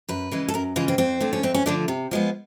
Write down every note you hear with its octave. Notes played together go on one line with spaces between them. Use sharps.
F#2 B4
C#3 E3 G#3
A4
F#2 A#4
C#3 E3 G#3 F4
C4
F2 C4
D3 F3 A3
C#4
F2 C4
C#4
D3 F3 A3 D4
C3
F3 G#3 B3